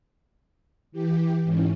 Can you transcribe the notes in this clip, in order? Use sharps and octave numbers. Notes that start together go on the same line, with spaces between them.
E3 G4
G#2 E3 C#4